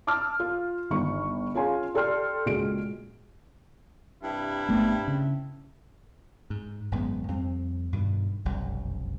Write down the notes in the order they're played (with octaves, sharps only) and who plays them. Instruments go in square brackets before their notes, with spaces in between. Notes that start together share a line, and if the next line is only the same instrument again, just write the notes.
[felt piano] A5 D6 E6 F6
F4
G1 D#3 C#6
C#4 F4 G#4 F5 G#5 C6
G4 A4 D5 G5 C6 F6
C#2 A#2 G#3 F#4 G#4 D7
[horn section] G2 C3 E4
[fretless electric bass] G#1 A3 B3
C#3
[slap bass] G#2
G#1 F#2 G#3 B3
F2 G3 C4
G2 B2 D#3
F1 B1 F#2 G3